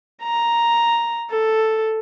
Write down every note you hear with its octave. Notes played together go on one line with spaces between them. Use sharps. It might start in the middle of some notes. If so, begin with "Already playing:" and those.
A#5
A4